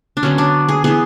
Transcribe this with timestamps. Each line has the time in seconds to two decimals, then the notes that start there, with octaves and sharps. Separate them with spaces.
0.17 D4
0.23 D3 F#3 B3 C#4
0.38 D4
0.68 G#4
0.84 E3 B3 G#4